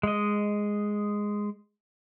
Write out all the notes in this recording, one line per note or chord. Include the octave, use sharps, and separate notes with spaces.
G#3 D#5